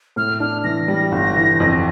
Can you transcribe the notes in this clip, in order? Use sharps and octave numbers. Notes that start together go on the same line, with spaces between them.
A2 F6
D4 F6
E3 A#6
G3 A#6
G1
E3
F2